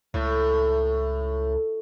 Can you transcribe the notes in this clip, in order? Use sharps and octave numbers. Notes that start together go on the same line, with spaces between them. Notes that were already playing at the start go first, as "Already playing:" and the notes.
C#2 A2